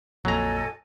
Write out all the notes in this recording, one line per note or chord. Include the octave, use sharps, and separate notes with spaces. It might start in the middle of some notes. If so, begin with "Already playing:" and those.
A#1 F2 A#2 F#3 A4 D#5 G#5 A#5